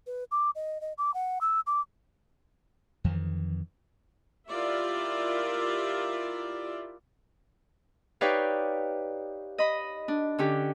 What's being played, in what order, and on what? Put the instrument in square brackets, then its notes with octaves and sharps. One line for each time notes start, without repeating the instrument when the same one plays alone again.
[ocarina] B4
D6
D#5
D#5
D6
F#5
E6
D6
[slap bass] F2 D#3 E3
[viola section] E4 F4 G4 A#4 D5 E5
[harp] D#4 G4 B4 C#5 D5 F5
D#5 B5
D4
D3 C#4 G4